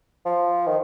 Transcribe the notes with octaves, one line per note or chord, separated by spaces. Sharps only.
F3
D#3